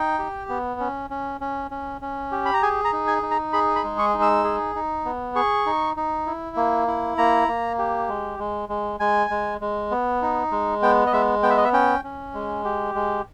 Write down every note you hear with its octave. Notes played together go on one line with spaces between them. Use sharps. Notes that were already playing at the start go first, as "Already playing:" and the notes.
Already playing: D#4 G5
G4
B3
C#4
C#4
C#4
C#4
C#4
G4
B5
A#5
G#4 G#5
A#5
D#4
G#5
D#4
A#5
G#4 B5
B5
G#3
C#6
D#4
E6
G#4
D#4
B3
G#4 C#6
D#4
D#4
E4
A#3
E4
A#3 A#5
A#3
G4
G#3
G#3
G#3
G#3 G#5
G#3
G#3
B3
D#4
G#3
B3 G5
D#5
G#3 E5
B3 G5
E5
D#5
E5
C#4 G5
C#4
G#3
G4
G#3